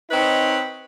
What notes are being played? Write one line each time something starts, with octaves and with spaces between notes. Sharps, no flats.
C4 D#4 B4 C#5